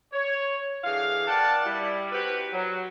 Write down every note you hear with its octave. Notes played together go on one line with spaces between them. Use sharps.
C#5
D3 E3 G#4 F5
A#4 D5 F#5 G5 A5
G3 E4
C4 F#4 G4 B4
F#3